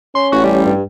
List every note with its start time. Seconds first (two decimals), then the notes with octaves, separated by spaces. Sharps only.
0.15 C#4 C6
0.32 A1 F#4
0.44 G3
0.66 G2